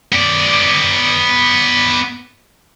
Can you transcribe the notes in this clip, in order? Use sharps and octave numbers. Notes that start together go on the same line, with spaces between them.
B3 D5